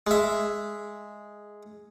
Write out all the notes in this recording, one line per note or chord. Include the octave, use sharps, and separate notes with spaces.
G#3 E5